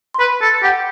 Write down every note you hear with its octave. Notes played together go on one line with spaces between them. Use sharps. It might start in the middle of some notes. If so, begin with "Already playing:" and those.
C6
B4 B5
A4
G4 F#5